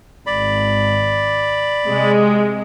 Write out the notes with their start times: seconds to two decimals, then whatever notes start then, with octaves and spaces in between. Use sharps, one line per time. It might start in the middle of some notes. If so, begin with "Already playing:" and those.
0.27 G#1 D5 B5
1.87 C3 G#3